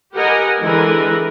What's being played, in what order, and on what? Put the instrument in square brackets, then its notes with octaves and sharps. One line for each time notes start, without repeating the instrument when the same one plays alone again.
[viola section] G4 A#4 B4 D#5 F#5 G#5
D3 E3 G#3 A#4 B4